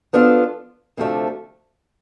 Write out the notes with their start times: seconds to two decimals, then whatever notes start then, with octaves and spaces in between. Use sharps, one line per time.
0.13 F3 B3 D4 F4 A4
0.97 D2 C3 F3 A3 D4